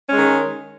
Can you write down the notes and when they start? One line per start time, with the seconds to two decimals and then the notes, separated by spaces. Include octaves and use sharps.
0.07 C#4
0.12 G#3
0.17 D#3